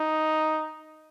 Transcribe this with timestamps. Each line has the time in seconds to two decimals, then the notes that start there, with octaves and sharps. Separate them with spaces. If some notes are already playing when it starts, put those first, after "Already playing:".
Already playing: D#4